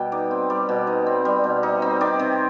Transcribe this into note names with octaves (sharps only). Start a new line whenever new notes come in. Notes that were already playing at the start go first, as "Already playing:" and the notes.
Already playing: B2 G3 G5
D#4 D5
C4
G3 D5
B2
D#4
C4
G3
B2
D#4
C4
D#3 D5
C3